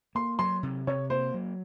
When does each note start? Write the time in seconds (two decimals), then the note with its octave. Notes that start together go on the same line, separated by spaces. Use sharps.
0.15 A#3 C6
0.39 F#3 C6
0.63 C3
0.87 C3 C#5
1.10 A#3 C5
1.34 F#3